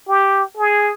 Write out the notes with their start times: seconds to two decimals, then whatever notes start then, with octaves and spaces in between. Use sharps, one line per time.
0.08 G4
0.57 G#4